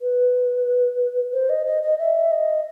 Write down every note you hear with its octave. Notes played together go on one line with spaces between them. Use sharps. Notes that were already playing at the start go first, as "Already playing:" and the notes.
B4
C5
D#5
D#5
D#5
E5
D#5